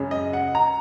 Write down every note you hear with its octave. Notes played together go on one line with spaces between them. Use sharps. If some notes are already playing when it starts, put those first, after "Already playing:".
Already playing: F#2 C#3 G#3 C#4
D#5
F#5
A#5